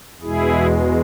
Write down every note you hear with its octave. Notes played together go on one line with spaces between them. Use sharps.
E2 B2 G#3 E4 G#4